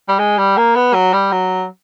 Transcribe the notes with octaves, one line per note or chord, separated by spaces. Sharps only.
G3
G#3
G3
A#3
B3
F#3
G3
F#3